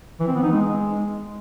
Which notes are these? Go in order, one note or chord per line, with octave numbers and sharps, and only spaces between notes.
E3
C4
B3
D#4
G#3